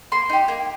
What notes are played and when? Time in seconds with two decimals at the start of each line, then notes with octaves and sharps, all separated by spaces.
0.12 A#3 C6
0.29 D#4 G4
0.48 A#3